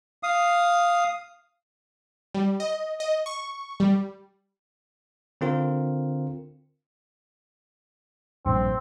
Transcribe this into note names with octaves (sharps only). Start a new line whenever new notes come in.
F5 D#6
G3
D#5
D#5
C#6
G3
D3 C4 F4 A#4
A#1 G2 C4